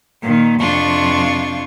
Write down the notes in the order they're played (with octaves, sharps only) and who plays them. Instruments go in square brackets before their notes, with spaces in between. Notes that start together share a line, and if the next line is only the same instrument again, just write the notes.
[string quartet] A#2 D#3
F2 C3 D4 F4 C#6